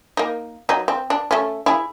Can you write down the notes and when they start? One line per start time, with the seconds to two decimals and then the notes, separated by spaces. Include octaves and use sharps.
0.17 A#3 D#4
0.69 F#3 D#4
0.88 C4
1.10 D4
1.31 A3 C#4
1.66 E4 G#4